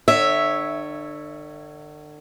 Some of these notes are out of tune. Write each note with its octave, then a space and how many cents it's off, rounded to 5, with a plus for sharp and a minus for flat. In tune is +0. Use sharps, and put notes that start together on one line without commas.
D3 +40 C#5 +0 E5 -5